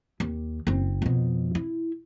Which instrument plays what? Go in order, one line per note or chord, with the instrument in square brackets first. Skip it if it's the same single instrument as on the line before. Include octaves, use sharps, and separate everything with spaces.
[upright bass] D#2
F#1 C4
F2 B2
E4